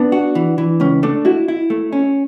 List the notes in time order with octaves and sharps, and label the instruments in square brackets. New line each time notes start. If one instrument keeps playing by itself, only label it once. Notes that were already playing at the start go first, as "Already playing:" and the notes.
Already playing: [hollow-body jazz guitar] B3 [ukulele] D4
[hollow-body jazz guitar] F#4
E3
E3
[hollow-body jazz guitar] C#2 [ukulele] C#4
[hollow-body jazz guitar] A3 [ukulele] D4
[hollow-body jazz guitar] E4 [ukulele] F#4
[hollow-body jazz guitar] E4
A3
C#4